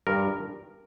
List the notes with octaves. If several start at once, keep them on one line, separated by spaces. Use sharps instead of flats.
G2 A#4